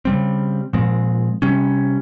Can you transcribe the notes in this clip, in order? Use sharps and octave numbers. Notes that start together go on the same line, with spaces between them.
C#3 G3 C4
A#2 F3 G#3 C4
C3 G3 C#4